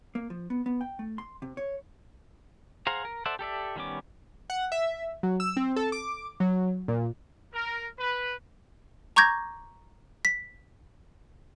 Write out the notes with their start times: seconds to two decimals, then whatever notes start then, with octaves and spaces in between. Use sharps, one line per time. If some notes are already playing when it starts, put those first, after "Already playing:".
0.15 A#3
0.30 F3
0.50 B3
0.66 B3
0.81 G5
0.99 A3
1.18 C6
1.42 C3
1.57 C#5
2.87 G#4 C5 F5 F#5 A#5
3.05 A#4
3.26 A4 C5 D5 E5 F#5
3.39 G4 A4 D5 E5
3.76 D#3 G3 B3 C#4 D6
4.50 F#5
4.72 E5
5.23 F#3
5.40 E6
5.57 C4
5.76 A4
5.92 D6
6.40 F#3
6.88 A#2
7.54 A#4
7.98 B4
9.16 A#5 C#6 D6 G6 G#6 A#6
10.25 B6